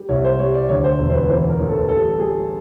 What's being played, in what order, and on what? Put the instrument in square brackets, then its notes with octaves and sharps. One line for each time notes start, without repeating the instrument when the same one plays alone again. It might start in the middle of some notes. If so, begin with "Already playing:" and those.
Already playing: [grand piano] G3
C2 C#5
C5
G3 C#5
D5
D2 C#5
C5
E1
C5
B4
E3 C5
A#4
A1
A4
G3 A4
G3 G#4